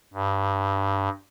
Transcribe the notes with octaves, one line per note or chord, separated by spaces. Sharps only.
G2